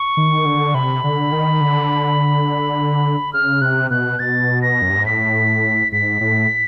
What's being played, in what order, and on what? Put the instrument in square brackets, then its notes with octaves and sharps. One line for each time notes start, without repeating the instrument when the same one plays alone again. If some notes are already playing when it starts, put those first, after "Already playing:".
Already playing: [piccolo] C#6
[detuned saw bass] D#3
D3
[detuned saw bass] C3 [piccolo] B5
[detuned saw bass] D3
D#3
D3
[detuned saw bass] C#3 [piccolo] F6
[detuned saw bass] C3 [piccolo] F#6
[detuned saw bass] B2 [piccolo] F#6
[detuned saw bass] B2 [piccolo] A6
[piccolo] A#6
[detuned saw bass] F#2
G2
G#2
[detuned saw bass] A2 [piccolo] B6
[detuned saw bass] G#2 [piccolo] B6
[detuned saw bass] A2